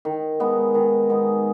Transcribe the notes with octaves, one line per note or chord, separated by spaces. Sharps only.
D#3
G#3 B3 D#4
D#3
G#3 B3 D#4